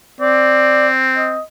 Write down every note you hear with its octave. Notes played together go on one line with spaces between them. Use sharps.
C4 D5
D#5